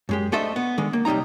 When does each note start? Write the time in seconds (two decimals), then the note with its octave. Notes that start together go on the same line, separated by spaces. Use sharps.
0.09 F#2 G#3 G4
0.32 A3 D4 A4 C5 D#5 E5
0.56 B3
0.78 D3 D#3 G#3
0.93 A#3
1.05 B1 C3 G3 D#4 A#5